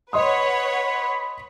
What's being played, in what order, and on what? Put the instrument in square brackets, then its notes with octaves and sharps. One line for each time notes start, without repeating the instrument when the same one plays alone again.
[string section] B4 C#5 F#5 [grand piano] D#5 C6 D#6 [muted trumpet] B5